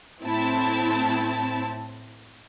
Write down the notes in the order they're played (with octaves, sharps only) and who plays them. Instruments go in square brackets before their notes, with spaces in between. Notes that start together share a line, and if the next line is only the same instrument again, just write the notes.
[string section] A2 C4 E4 A5